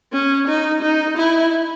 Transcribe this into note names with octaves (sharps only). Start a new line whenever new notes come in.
C#4
D#4
D#4
E4